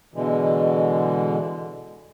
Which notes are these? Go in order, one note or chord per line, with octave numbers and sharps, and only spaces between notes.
B2 D3 E3 G#3